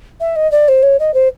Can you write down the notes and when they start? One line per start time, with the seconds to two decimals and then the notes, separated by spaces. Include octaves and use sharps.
0.20 E5
0.36 D#5
0.52 D5
0.68 C5
0.83 C#5
1.00 D#5
1.14 C5